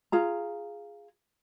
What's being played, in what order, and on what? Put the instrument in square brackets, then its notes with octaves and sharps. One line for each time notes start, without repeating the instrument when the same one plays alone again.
[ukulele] F4 G#4 A#5